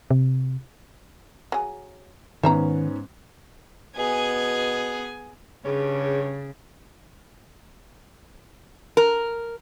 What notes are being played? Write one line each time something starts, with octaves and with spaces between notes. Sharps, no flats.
C3
F#3 G#4
G#2 D#3 B3 C#4 C5 E5 A#5
B2 B3 G#4 G#5
G2 C#3 G#4 C#5
A#4